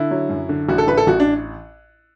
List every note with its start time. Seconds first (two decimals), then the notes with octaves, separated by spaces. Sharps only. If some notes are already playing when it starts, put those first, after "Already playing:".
Already playing: D3 E4
0.11 F#3
0.29 F#2
0.49 D3
0.69 A1 F#4
0.78 A4
0.87 A1 B4
0.97 A4
1.07 A1 F#4
1.20 D4